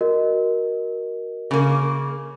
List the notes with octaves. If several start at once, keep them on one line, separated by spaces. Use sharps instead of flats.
F#4 A#4 D#5
C#3 A#3